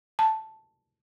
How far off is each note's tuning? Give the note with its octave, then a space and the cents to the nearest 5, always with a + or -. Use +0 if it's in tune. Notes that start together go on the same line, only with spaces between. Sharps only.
A5 +0